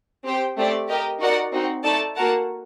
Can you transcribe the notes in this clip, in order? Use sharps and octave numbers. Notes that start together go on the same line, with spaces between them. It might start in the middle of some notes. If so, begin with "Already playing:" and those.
C4 G4 C5 G5
A3 C4 G4 D5
G4 A#4 D#5 G5
D#4 F#4 A#4 D5 F#5
C4 D#4 F#4
A3 D#4 A4 D5 A5
A#3 F#4 A#4 F#5 A5